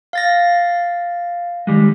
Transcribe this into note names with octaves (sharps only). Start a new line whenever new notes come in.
F5 A6 A#6
D#3 G3 G#3